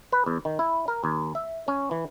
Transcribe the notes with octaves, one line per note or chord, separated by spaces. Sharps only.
B4
E2
D#3
E4
A#4
D#2
E5
C#4
E3